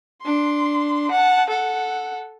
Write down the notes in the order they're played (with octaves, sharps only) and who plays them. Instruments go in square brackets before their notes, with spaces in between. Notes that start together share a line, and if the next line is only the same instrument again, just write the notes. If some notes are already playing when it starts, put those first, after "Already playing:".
[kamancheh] D4 C6
F#5 A5
A4 F#5